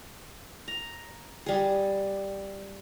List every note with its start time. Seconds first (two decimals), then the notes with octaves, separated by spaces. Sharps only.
0.68 A#5
1.46 G3 G#4